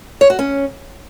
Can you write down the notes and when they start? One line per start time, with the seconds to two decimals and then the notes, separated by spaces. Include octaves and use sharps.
0.21 C#5
0.30 F#4
0.39 C#4